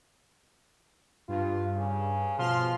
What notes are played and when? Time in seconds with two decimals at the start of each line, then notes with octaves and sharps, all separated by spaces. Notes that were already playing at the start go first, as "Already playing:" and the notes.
1.28 G2 F4
1.77 C#3
2.38 B2 F3 C6 F6